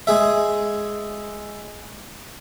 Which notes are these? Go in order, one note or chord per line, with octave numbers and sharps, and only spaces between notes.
G#3 G#4 E5